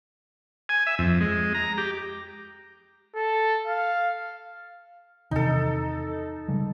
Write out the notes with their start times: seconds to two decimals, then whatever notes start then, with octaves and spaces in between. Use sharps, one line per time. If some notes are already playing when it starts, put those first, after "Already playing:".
0.69 G#5
0.87 E5
0.99 F2
1.21 G#3
1.54 A#5
1.78 G4
3.16 A4
3.67 F5
5.31 E2 C3 D#3 D#4 A4
6.48 C#3 G3 G#3